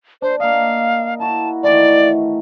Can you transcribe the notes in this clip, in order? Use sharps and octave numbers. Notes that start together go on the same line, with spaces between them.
D4 C5
A#3 D#5 F5
E4 F#4 A5
D#3 E3 A3 D5